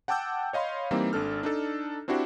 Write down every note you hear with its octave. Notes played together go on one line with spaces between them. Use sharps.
F#5 G5 A5 D6 E6 G6
C#5 D#5 F5 B5 C6
E3 G3 A#3 C4 D#4
G#1 D4 A4 F6
D4 D#4 A4
C4 D4 E4 F#4 G4 C5